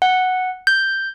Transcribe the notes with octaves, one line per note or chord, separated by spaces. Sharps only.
F#5
G6